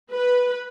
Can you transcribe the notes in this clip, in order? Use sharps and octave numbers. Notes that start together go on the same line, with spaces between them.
B4